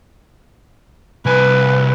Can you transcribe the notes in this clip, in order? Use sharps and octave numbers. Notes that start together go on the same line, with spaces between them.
C2 B4 G#5